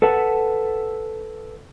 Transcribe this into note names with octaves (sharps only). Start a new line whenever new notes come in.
A4 B4 E5 F#5 A5